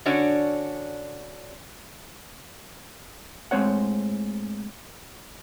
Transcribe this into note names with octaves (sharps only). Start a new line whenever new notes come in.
D3 C#4 D4 F#4 C#5 D5
A2 G#3 C4 C#5 F#5